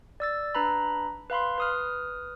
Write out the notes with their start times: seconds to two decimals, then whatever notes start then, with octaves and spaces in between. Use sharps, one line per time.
0.20 D5 E6 A6
0.55 D4 B4 A#5 B5
1.30 B4 F5 B5 C6
1.58 B4 D#6 F6